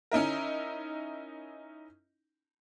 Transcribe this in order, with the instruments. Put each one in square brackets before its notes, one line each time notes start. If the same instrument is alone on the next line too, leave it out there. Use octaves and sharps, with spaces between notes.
[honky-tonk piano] C#4 D#4 E4 A#4